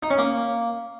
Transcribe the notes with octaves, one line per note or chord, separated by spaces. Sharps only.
D#4
C#4
A#3